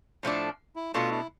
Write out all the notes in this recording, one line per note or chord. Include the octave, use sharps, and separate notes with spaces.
A2 F3 A3 D4 A4
E4
B2 A3 D4 F4 A4
E4